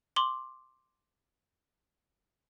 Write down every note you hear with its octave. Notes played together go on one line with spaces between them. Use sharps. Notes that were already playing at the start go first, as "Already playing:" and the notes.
C6 D6 F#7